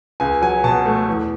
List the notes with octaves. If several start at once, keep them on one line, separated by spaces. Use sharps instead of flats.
C#2 G#5
F#3 G#5
B2 A5
A3
E2